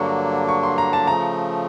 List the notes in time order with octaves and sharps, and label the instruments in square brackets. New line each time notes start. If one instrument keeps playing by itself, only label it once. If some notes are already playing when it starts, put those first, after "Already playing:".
Already playing: [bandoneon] G2 D3 F#3 A#3 D4 [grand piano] C#6
[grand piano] C#6
C6
A#5
A5
[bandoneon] C#3 F3 A3 [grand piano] A#5